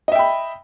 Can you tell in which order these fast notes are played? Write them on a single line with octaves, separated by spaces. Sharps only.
D#5 E5 G5 B5